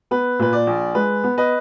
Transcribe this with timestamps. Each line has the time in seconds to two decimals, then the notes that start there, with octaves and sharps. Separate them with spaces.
0.11 B3 B4
0.39 A#2 B4
0.53 D5
0.67 A#1
0.95 G#3 B4
1.24 B3
1.38 B4 D#5